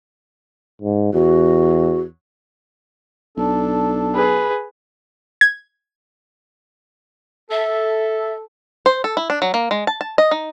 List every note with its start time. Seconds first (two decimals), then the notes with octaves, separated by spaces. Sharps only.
0.82 G#2
1.13 E2 F#4
3.38 B1 D4 A4
4.15 G#4 B4
5.41 G#6
7.51 A4 E5
8.86 C5
9.04 A4
9.17 E4
9.30 D4
9.42 F#3
9.54 A#3
9.71 G#3
9.87 A5
10.01 A5
10.18 D#5
10.31 D#4